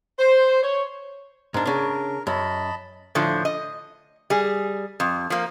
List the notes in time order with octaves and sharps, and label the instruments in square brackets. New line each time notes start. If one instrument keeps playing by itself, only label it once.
[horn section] C5
C#5
[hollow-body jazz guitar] G#2 D4 [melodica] A#4
[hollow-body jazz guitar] C#3 D4
[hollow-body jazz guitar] F#2 [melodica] D#5 A5 B5
[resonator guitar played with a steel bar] A2 D3 F3
D#5
G3 G#4
F2
F3 A#3